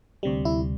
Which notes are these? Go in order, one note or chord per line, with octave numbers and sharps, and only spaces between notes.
D2 C3 G3
E4